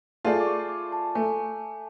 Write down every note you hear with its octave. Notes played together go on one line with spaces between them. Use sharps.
A3 F4 G#4 D5 A5
D6
C#6
D6
A5
A3 G#5